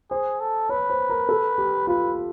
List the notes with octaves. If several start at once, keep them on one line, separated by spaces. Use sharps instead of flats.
G#4 C5
A4
B4 C#5
C5
A#4
A4
G4
F4 B4